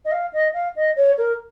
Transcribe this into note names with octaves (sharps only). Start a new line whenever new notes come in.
D#5
F5
D#5
F5
D#5
C#5
A#4